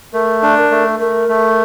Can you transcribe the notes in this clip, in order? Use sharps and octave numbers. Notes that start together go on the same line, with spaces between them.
A3 A#4
D4
A#4
A3
A3 A#4
A3